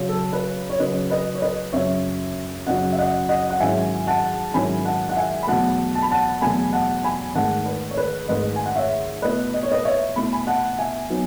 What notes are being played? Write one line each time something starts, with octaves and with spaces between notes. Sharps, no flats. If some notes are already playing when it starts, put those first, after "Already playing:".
Already playing: C#3 F#3 C#4
A4
B4
C#5
C#3 F#3 C#4 B4 D#5
B4 D#5
C#5
B4 D#5
F#2 C#3 F#3 C#5 E5
F#2 C#3 F#3 D#5 F#5
E5
D#5 F#5
D#5 F#5
F#5
G#2 D#3 F#3 C#4 E4 E5 G#5
F#5 A5
G#2 D#3 F#3 C#4 E4 G#5 B5
F#5 A5
F#5
E5 G#5
B5
E2 B2 F#3 A3 F#5 A5
A5
B5
F#5 A5
E2 B2 F#3 A3 G#5 B5
F#5 A5
G#5 B5
G#2 D#3 A3 F#5 A5
B4
C#5
B4
G#2 D#3 A3 B4 D#5
G#5
F#5
C#5 E5
B2 A3 E4 B4 D#5
D#5
C#5
B4 D#5
C#5 E5
B2 A3 E4 B5
G#5 B5
F#5 A5
E5 G#5
F#3 B3 D#4